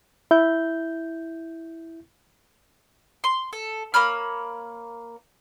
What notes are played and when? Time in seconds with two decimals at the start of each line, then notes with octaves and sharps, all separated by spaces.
0.31 E4 G6
3.24 C6
3.53 A4
3.94 A#3 C#5 B5 F6